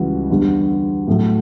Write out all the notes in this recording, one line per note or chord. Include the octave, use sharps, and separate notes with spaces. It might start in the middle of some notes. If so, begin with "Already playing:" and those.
Already playing: C#2 C#3 E3 G3 F#4
E2 D3 G3
A2 F#3 A3